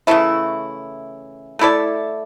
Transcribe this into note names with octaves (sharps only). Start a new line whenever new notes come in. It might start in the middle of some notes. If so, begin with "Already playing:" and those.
C#3 E3 A3 E4
A3 E4 A4 D5